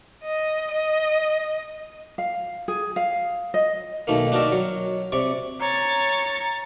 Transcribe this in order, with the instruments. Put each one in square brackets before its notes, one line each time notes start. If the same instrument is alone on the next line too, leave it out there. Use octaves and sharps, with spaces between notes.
[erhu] D#5
D#5
[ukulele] F5
G#4
F5
D#5
[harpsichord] B1 D#3 A3 A#3
D4 D#4 F#4 A#4 D5 E5
F#3
C3 D5 C#6
[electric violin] C#5 A6 [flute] A#5